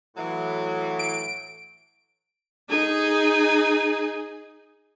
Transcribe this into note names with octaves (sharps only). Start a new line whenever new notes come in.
A2 E3 F#3
D7
D#4 G#4